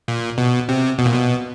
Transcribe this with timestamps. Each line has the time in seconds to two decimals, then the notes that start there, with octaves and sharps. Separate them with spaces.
0.08 A#2
0.38 B2
0.69 C3
0.99 B2
1.06 A#2
1.14 B2